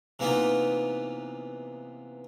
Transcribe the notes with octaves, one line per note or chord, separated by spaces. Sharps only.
C3 E3 A#3 B3 D#4 F4